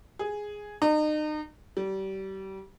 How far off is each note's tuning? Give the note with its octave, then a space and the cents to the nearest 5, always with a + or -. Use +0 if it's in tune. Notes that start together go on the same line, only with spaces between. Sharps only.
G#4 +0
D#4 -35
G3 -30